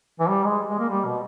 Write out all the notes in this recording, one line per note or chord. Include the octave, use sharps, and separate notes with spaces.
E3
G3
G#3
G#3
A#3
G3
B2